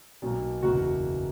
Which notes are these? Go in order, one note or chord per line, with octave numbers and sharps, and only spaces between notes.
B1 B2 A#3
F#1 E2 B2 A#3 F#4